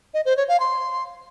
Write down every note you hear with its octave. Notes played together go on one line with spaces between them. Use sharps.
D#5
C5
C#5
F5
C6